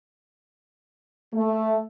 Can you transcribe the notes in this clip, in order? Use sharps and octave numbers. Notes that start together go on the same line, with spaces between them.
A3